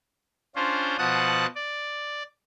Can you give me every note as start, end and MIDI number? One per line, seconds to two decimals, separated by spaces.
0.56 0.96 61
0.56 0.96 62
0.56 0.96 65
0.56 0.96 72
0.98 1.46 47
0.98 1.46 53
0.98 1.46 78
0.98 1.46 81
0.98 1.46 87
0.98 1.46 90
1.55 2.23 74